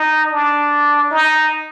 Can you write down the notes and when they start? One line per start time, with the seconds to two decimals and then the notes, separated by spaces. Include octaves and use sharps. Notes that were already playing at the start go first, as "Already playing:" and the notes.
Already playing: D#4
0.32 D4
1.11 D#4